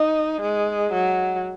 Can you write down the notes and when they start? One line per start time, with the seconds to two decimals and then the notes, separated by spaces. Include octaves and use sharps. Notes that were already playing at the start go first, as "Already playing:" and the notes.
Already playing: D#4
0.41 G#3
0.92 F#3